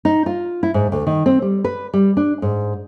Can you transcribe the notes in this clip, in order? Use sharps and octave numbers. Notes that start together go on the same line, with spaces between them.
D#4
F4
E4
G#2
D2
D#3
C4
G3
B4
G3
D4
G#2